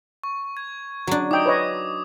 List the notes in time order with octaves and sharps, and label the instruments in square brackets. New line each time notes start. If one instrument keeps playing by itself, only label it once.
[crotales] C#6
G#6
[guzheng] F#3 D4
[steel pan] D#4 G5 [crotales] D6 D#6
[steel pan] B4 C#5 D#5